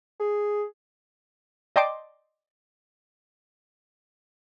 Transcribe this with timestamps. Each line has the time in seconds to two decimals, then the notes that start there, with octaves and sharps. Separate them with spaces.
0.20 G#4
1.76 D5 D#5 G5 A5 C6 D6